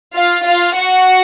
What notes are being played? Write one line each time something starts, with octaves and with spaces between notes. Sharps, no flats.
F4 F5
F4 F5
F#4 F#5